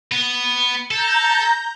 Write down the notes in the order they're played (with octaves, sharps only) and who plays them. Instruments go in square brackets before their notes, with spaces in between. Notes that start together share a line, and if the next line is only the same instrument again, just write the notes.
[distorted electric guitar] B3
[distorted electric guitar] A4 [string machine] A#5 G6